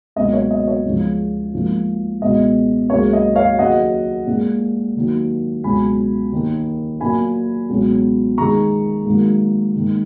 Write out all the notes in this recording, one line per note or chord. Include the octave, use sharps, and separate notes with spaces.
C#2 B2 F#3 A#3 D#5
C#5
D#5
C#5
C#2 C#3 F3
G#2 F3 A#3
C#2 B2 G#3 D#5
C#2 C#3 F#3 A#3 C#5
D#5
C#5 F5
D#2 C#3 F#3 D#5 F#5
A#2 G#3
D#2 D#3 F#3 A#3
C#2 B2 F#3 G#5 B5
D#2 D#3 A#3
A#2 F#3 A#3 G#5 B5
C#2 B2 F#3
G#2 D#3 G#3 A#5 C#6
G#2 D#3 F#3 A#3
G#2 D#3 A#3